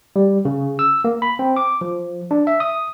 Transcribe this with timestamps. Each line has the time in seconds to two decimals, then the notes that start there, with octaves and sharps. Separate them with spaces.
0.16 G3
0.45 C#3
0.79 E6
1.04 A#3
1.22 B5
1.39 C4
1.56 D6
1.81 F3
2.31 D4
2.47 E5
2.60 D#6